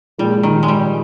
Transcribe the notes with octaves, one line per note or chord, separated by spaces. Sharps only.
A#2 F3 G3 G#3
D#3
G#3
G3